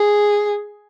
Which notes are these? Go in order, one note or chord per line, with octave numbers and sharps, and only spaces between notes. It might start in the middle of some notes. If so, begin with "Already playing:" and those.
Already playing: G#4